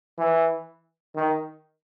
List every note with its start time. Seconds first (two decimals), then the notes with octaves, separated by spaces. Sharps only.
0.18 E3
1.15 D#3